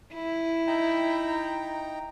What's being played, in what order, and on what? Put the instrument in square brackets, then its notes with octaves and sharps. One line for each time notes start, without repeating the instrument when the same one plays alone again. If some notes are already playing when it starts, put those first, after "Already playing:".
[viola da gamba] E4
[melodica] D#4 G5 A#5